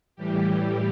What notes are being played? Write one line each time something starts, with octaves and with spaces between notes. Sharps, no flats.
A2 E3 G3 G4